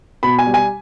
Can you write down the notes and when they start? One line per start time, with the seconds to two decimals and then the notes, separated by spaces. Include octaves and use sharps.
0.23 B2 B5
0.39 G#5
0.46 G3
0.54 G#5